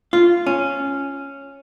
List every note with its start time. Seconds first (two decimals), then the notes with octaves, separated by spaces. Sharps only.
0.13 F4
0.47 C#4